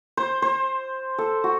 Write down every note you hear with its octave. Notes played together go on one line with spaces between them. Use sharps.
C5
C5
A4
F#4